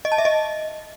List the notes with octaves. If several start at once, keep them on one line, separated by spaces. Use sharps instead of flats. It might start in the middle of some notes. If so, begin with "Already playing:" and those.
D#5
A5
E5
D#5